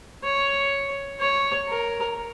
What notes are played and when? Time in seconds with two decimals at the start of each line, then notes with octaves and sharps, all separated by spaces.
0.24 C#5
1.20 C#5
1.68 A#4